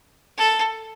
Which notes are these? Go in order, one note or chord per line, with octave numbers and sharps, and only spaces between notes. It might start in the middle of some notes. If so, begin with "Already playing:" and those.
A4